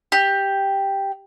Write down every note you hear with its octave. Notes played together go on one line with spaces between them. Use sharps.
G4